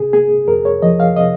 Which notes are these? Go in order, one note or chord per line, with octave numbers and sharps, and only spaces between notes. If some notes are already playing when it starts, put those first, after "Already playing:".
Already playing: C3 G#4
A#3 G#4
F2 A#4
C#5
F3 D#5
F5
C3 D#5